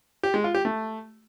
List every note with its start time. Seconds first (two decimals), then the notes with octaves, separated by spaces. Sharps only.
0.23 G4
0.34 G#3
0.44 F4
0.54 G4
0.65 A3